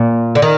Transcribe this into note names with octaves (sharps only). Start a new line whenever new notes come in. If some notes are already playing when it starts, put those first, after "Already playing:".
Already playing: A#2
D3
D#3